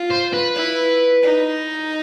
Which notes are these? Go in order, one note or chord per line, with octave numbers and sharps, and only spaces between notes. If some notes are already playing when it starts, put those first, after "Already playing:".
Already playing: F4
C5
B4
E4
D#4